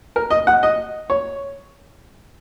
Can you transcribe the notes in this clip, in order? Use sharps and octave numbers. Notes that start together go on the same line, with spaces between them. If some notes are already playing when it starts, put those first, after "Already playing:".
A#4
D#5
F#5
D#5
C#5